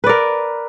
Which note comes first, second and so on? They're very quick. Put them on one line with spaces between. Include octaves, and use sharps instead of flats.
B4 D5 A#4